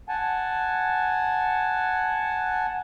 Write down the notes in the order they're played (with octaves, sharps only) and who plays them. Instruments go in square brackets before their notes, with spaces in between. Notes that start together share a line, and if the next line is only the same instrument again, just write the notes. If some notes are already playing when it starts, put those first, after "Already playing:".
[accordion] F#5 G#5 A5